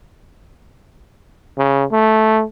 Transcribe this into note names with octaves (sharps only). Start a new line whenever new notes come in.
C#3
A3